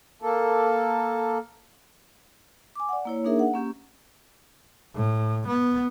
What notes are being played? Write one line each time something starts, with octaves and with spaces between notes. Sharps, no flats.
A#3 A4
G#5 D6
D5 F#5
A#3 E4 C#5
A#3 D4 D#4 G#4 A#4 E5
F#5
A#3 C#4 G4
A2
B3